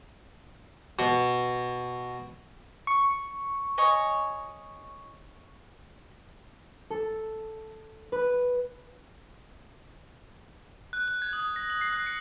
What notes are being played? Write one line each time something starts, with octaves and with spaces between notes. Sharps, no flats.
B2
C#6
C#5 D#5 G#5
A4
B4
F#6
F#6
G#6
D#6
A#6
F#7
C7
F#6
C#7